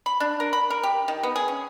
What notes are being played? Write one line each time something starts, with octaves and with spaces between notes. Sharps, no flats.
B5
D4
A#4
B5
A#4
G4
D#3
B3
G#4
C#4